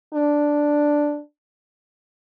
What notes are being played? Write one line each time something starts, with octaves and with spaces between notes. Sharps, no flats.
D4